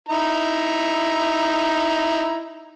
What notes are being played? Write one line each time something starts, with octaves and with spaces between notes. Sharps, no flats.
D#4 E4 A#5